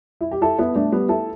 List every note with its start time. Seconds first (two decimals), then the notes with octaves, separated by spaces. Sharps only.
0.21 E4
0.31 G4
0.41 E4 A4
0.58 B3 E4
0.76 A3 D4
0.92 G3 B3
1.09 E4 A4